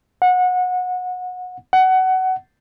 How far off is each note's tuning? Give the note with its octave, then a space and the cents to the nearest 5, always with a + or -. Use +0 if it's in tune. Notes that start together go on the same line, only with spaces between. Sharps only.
F#5 -25
F#5 +20